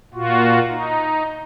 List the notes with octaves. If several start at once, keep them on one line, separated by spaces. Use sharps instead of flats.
A#2 F4 F#4
D#4